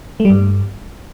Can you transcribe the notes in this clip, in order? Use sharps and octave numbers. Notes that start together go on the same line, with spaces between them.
A3
G3
G2